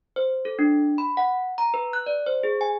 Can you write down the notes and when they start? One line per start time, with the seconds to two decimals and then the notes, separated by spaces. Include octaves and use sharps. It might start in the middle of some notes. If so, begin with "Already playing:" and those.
0.16 C5
0.45 A4
0.59 D4
0.98 B5
1.17 F#5
1.58 A#5
1.74 B4
1.93 F#6
2.06 D5
2.26 C5
2.43 G#4
2.61 G#5